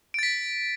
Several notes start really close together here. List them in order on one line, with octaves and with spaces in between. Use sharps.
D7 A6 B6